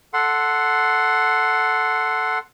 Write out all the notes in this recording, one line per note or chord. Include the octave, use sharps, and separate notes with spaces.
A4 F#5 C6